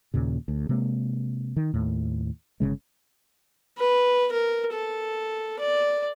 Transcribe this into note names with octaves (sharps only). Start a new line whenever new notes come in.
D#2 A#2 C#3
D2
C3 G#3 A#3
D#3
D#2 A2
G1 C#2 C#3 G#3
B4
A#4
A4
D5